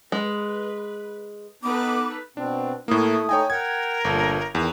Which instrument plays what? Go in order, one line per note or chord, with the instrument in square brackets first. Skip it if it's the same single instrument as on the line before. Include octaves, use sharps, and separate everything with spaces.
[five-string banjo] G#3 [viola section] B4
[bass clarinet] B3 [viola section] D#4 A4 B4 [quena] D6
[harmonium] B2 C4 [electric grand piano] D4
[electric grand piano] A2 A#3 [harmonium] A3 E4 [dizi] D#6
[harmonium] A3 D#4 D#5 [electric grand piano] C#5 G5 G#5
[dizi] A#4 [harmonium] F#5 G5 [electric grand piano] G#6
[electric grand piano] G1 [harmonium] G2 A#2 A4
[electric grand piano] E2 [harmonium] D#3